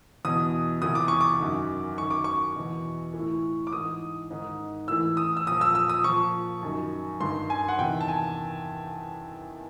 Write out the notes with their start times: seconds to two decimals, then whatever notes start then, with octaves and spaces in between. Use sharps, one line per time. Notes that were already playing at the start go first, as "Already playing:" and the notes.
0.25 E2 B2 D#6
0.82 E2 C3 E3 D#6
0.95 D6
1.08 C#6
1.21 D6
1.40 F#2 D#3
1.98 F#2 D#3 C#6
2.10 D6
2.24 C#6
2.56 E2 B2
3.14 E3
3.19 A2
3.67 D6
3.72 G#2 E3 D#6
4.31 G#2 D#3
4.88 A2 E3 E6
5.17 D#6
5.37 E6
5.47 A#2 F3 D#6
5.61 E6
5.75 E6
5.89 D#6
6.04 A#2 F3 C#6
6.62 F#2 D#3
7.20 G2 D#3 C6
7.50 G#5
7.68 F#5
7.78 E2 C3 D#3 G5
8.01 A5
8.08 G#5